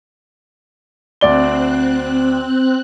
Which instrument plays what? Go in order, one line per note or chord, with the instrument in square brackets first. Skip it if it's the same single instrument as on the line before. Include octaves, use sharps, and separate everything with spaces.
[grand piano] D2 D5 G7 [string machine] C4 F#6